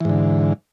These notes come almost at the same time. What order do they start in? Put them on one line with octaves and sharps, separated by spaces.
E3 G#2 D3